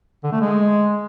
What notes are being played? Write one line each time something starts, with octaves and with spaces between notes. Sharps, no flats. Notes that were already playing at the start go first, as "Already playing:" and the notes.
D3
A3
G#3